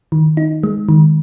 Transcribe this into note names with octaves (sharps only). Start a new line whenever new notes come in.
D#3
D#4
G#3
D#3